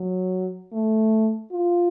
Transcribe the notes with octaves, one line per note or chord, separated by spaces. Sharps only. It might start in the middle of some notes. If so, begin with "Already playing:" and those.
Already playing: F#3
A3
F4